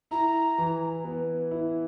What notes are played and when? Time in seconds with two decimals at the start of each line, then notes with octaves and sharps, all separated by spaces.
0.11 E4 A#5
0.58 E3
1.04 B3
1.51 E4